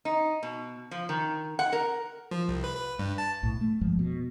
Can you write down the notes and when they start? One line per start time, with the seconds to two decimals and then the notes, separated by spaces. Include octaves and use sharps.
0.05 D#4
0.43 B2
0.91 F3
1.09 D#3
1.59 F#5
1.73 A#4
2.31 F3
2.48 C2
2.64 B4
2.76 B4
2.99 G2
3.18 A5
3.43 B1 A2
3.61 A3
3.81 G1 F2 F3 G#3
3.99 B2